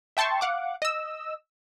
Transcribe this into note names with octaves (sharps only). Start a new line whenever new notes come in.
E5 G5 A5 C6 C#6
F5 F#5 D6
D#5 E6